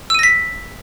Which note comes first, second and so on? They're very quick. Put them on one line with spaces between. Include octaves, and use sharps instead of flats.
E6 D#7 A#6 B6